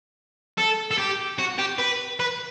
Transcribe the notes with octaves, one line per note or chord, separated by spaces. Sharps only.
A4
A4
G4
F#4
G4
B4
B4